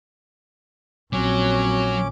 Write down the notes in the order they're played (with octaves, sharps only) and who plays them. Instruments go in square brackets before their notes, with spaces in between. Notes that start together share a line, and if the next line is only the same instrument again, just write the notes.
[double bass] A#1 [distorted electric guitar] F#3 [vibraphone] C4 F#4 C#5 [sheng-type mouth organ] C#4 D6